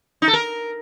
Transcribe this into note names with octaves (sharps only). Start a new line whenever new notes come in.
D#4
A4
A#4